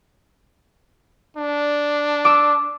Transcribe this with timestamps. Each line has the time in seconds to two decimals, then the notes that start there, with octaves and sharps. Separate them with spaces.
1.37 D4
2.25 D6 E6